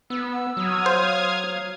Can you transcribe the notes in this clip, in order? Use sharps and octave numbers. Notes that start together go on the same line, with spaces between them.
B3 E6
F#3 D#6 F6 G#6
C5 F5